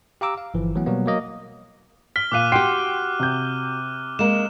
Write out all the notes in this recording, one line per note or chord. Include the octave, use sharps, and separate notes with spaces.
G4 F5 A#5 D6 E6
F5
G1 E3 F3
E3 F#3 A3 B3
B2 F#3 G3 A#3 B3
F#3 A#3 D#5
F6 B6 G7
A#2 F5 D6 F#6 D#7
F#4 G4 G5 C6 C7
C3 G6
G#3 A#3 E7